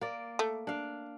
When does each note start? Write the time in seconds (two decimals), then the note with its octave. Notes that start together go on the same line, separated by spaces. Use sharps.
0.01 A#3 D5
0.39 A3
0.67 D4 F5